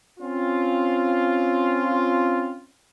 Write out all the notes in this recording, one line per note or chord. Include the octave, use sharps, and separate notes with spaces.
C4 C#4 F4